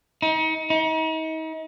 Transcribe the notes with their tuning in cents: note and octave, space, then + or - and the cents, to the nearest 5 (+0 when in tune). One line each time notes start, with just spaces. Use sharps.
D#4 +35
D#4 +40